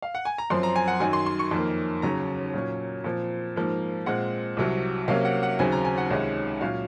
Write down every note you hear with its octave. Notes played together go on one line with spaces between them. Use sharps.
F5
F#5
G#5
A#5
F#2 F3 C4 C6
A#5
G#5
F#5
F#2 D#3 F#3 G#5
C6
C6
C#6
F2 D#3 A#3 C6
D#2 C#3 F#3 C#4 A#5
A#2 F#3 C#4
A#2 F3 C4
G#2 F3 A#3
A#2 G#3 C4 F#5
C2 C3 F#3
C3 F#3 A#3 C#4 F5
F#5
F#5
D#2 C#3 F#3 C4 G#5
A#5
G#5
F#5
C#2 C3 D#3 G#3 C#4
A#2 F#3 C#4 F5